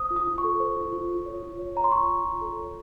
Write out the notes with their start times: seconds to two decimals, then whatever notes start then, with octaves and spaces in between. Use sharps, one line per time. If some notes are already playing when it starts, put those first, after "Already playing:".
Already playing: C5 D#6
0.11 F4
0.16 D#6
0.27 F4
0.38 C#6
0.44 A4
0.60 C5
0.76 F4
0.92 F4
1.09 F4
1.26 C#5
1.43 F4
1.59 C#5
1.76 C#5 A#5
1.84 C6
1.92 F4 C#6
2.08 C#5
2.24 F4
2.41 A4
2.57 C#5